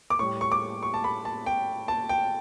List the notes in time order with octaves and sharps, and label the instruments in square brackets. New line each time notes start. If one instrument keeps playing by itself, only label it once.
[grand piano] D6
A2 G3 C#6
C#6
D6
C#6
A5
B5
A5
G5
A5
G5